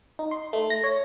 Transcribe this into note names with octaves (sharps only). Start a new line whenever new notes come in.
D#4
C6
A3
A#6
C#5